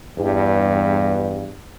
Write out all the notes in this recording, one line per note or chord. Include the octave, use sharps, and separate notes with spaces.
E2 G2